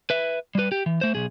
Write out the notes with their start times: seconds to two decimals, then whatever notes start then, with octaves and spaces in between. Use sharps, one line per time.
0.10 B4 E5
0.55 G3 B4
0.72 G4
0.86 E3
1.01 A3 C5
1.15 B1 G#4